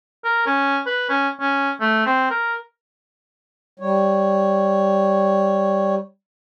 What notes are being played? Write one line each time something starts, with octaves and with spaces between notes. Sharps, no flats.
A#4
C#4
B4
C#4
C#4
A3
C4
A#4
G3 C#5